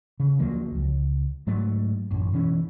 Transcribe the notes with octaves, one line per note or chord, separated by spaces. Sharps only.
C#3
D2 F3 F#3 A#3
C#2
G#2 F#3 A3
A1 F#2
B2 E3 C#4